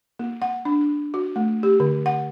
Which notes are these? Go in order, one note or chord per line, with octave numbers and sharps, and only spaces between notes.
A#3
F#5
D4
F#4
A3
G4
D3
F#5